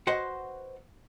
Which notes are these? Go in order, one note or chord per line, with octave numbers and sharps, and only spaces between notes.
F#4 B4 C5 D#5 F#5